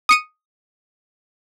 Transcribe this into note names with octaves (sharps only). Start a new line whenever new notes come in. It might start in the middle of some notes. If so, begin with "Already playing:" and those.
D#6 C#7 D#7